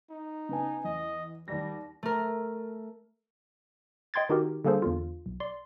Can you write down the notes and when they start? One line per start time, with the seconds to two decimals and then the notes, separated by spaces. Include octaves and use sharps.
0.10 D#4
0.49 C#3 B3 G#5
0.84 E2 D#5
1.48 D#2 G3 D5 A#6
2.03 A3 A#4
4.14 D#5 G5 C6 G#6 A6
4.29 D#3 D#4 F#4 G4 A#4
4.65 D3 G3 A#3 G#4 A4 C5
4.82 E2 D3 F4
5.26 B1
5.40 D5 C6